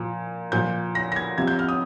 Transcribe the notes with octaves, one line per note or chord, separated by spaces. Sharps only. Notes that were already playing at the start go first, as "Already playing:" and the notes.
Already playing: A#2 F3
A#2 F3 G6
A#6
A#6
G#6
C3 F3 G#6
G6
F6
D#6